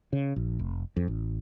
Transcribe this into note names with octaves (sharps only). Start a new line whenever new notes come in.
C#3
A#1
F1
F2
A1